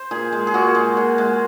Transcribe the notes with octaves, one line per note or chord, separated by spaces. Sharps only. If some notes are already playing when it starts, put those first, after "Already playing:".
Already playing: C5
A#2 G#4
G#3
G#4
A#2 F#4
G#3
A#2
G#3